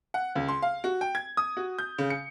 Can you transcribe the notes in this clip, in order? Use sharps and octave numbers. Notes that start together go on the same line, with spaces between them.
F#5
C#2
C6
F5
F#4
G5
G#6
D#6
F#4
G6
C#3
C#7